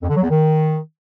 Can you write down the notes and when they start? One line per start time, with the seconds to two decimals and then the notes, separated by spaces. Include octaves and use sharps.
0.02 F2
0.09 D3
0.16 F#3
0.23 E2
0.30 D#3